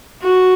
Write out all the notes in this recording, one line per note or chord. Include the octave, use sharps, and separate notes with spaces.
F#4